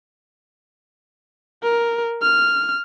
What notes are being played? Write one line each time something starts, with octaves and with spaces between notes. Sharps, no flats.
A#4
F6